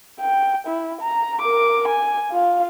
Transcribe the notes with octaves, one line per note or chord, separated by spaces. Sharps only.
G5
E4
A#5
A#4 D6
G#5
F4 F5